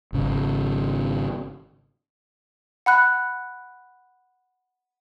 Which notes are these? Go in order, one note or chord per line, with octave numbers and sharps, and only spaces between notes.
G#1 C#3
F#5 B5 F#6